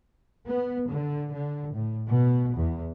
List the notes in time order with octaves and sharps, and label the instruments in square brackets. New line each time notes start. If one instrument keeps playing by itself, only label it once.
[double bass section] B3
D3
D3
A2
B2
E2